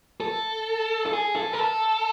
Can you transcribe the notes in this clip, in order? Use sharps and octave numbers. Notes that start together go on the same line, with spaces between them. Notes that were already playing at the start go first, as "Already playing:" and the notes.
A4
A4
G#4
A4
A#4
A4